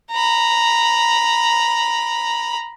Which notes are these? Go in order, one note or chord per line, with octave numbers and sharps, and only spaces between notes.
A#5 B5